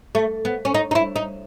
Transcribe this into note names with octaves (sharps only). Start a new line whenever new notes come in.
A3
B3
C#4
D#4
D#4
E4
D#4